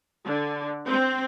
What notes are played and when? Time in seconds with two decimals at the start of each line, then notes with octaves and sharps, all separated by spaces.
0.24 D3
0.87 C4